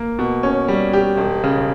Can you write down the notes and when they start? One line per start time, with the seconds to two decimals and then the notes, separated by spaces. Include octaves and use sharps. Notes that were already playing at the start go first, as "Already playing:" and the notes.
Already playing: A#3
0.19 B2
0.43 C#4
0.68 G3
0.93 G4
1.17 E1
1.44 C#3